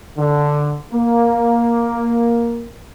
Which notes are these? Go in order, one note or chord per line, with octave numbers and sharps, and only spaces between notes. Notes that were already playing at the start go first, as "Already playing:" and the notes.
D3
A#3